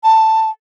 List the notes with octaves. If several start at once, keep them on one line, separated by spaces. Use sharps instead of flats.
A5